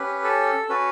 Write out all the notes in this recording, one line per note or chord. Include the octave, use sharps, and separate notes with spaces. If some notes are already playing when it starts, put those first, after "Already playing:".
Already playing: C#4 G4 B4
A4
C#4 F#4 B4